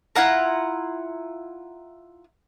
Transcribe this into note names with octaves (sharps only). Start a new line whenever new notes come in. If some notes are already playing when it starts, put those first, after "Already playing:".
E4 F4 F#5 A#5